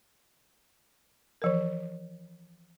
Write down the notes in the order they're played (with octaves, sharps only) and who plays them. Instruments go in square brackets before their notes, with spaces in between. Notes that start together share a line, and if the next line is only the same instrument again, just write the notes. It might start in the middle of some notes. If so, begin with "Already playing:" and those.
[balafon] E3 F3 A#4